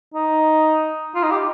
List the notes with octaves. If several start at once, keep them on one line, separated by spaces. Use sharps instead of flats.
D#4
F4
D#4
G4